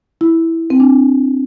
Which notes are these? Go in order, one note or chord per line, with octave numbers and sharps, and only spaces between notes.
E4
C4
D4